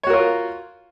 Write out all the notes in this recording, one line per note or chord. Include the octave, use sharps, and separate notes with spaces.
F4 F#4 A#4 C#5